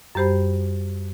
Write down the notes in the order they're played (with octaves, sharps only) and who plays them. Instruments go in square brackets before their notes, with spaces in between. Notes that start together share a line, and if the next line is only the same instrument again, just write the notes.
[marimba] F#2 G3 G4 C5 B5